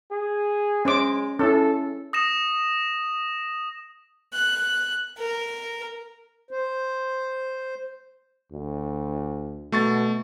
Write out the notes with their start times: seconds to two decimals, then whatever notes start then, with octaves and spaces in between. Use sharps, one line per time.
0.11 G#4
0.85 G#3 C#4 C5 D6
1.39 C#4 E4 A4
2.13 D#6 A#6 E7
4.33 F#6
5.18 A#4
6.51 C5
8.52 D2
9.72 B2 A3 C#6 A6